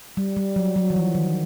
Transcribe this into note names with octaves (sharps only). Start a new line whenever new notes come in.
G3
G3
F#3
F#3
E3
F3
D#3